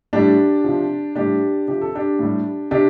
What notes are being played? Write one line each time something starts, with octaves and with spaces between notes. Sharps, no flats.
A2 G3 D4 G4
C3 F3
A2 G3 D4 G4
C3 F3 G4
A4
D4 G4
A2 G3
C3 D4 G4